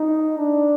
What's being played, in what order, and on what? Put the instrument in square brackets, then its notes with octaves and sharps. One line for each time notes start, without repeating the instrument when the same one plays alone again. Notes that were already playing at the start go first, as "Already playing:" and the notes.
Already playing: [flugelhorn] D#4
D4